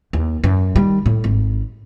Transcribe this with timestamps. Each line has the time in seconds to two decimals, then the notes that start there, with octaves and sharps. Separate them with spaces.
0.13 D#2
0.44 F#2
0.76 D#3 G3
1.06 A2
1.24 G#1